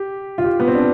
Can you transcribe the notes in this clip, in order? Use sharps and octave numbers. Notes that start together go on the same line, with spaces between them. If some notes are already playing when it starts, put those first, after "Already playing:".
Already playing: G4
F4
G4
B3
C4
D4